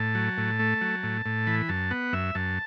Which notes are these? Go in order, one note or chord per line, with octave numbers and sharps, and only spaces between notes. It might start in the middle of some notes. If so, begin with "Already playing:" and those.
Already playing: A2 A5
F#3
A2
A3
F#3
A2
A2
E3 B5
F#2 A5
B3 F#5
F#2 E5
F#2 A5